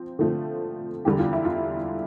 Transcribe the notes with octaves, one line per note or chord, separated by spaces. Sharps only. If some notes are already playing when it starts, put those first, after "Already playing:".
Already playing: F3 C4
D3 F3 A3 C4
E2 D3 G3 G4
F4
E4
F4